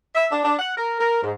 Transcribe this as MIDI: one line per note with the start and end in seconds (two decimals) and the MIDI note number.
0.15 0.27 76
0.32 0.41 62
0.44 0.55 62
0.59 0.73 78
0.76 0.97 70
1.00 1.22 70
1.23 1.30 44